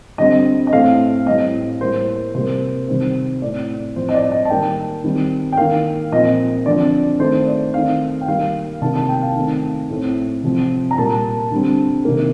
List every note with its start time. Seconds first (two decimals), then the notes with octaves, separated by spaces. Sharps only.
0.18 D3 G3 C4 D#5
0.67 D#5
0.73 A2 A3 C4 F5
1.26 A2 G3 C4 D#5
1.81 A2 G3 A#3 C5
2.35 C3 G3 A#3 C5
2.88 C3 D#3 G3 C4 C5
3.42 A2 A3 C4 D5
3.96 A2 F3 C4 C5
4.09 D#5
4.14 D5
4.32 D#5
4.45 A5
4.50 D#3 G3 A#3 G5
5.04 D#3 G3 C4
5.52 G5
5.57 D#3 A#3 F5
6.12 A#2 F3 C4 D#5
6.66 D3 F3 C4 D5
7.20 D#3 A3 C4 C5
7.47 D5
7.74 D#3 A3 C4 F5
8.21 G5
8.28 D#3 G3 A#3 F5
8.82 C3 D#3 A#3 A5
8.95 A5
9.09 G5
9.22 F5
9.36 D#3 A3 C4
9.90 A2 A3 C4
10.43 C3 F3 C4
10.91 A#5
10.98 A#2 G3 A#3 A5
11.51 D3 G3 C4
12.05 C3 D#3 A#3